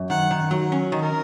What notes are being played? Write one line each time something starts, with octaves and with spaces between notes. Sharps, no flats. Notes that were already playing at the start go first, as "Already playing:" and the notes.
Already playing: F#2
D#3 F#5
D#3
F#3
C#4
D#3
A#4